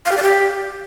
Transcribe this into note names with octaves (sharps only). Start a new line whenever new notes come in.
F5
G4
D5
G4